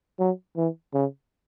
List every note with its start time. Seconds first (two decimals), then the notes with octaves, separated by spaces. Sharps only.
0.19 F#3
0.57 E3
0.94 C#3